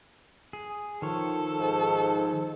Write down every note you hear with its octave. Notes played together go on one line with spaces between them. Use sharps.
G#4
D#3 F3 A4 C#5
G#2